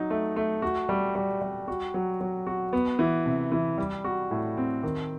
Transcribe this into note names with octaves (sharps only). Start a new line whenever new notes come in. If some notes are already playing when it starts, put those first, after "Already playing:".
Already playing: F#3 D#4
A3
A3
F#4
G3
G3
G3
F#4
F#3
F#3
F#4
B3
E3
C3
E3
G3
F#4
A2
C4
D#3